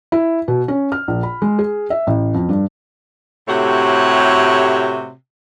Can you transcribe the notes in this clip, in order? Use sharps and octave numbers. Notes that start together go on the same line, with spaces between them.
E4
B2
C#4
F6
A#1
B5
G#3
G#4
E5
A1
F2
G2
A2 C3 A3 F#4 G4 C#5